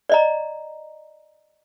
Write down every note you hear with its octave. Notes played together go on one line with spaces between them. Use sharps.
D5 D#5 A#5